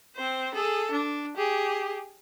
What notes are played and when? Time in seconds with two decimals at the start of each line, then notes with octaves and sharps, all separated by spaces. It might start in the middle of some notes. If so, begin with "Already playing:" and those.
0.15 C4 C5
0.54 G#4 A4
0.92 D4
1.37 G4 G#4